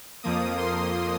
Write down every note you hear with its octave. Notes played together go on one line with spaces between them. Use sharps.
F2 F3 A#3 D#6
C6